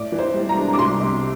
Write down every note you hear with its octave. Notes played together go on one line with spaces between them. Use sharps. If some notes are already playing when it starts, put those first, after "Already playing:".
Already playing: A2 D5
E3
C5
G3
A#5
D4
D6
C2 C6
C3